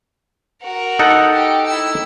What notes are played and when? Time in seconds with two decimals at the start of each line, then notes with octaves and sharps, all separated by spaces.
0.62 F#4 A#4
0.99 D#4 A4 F#5
1.33 G4
1.67 E4 E6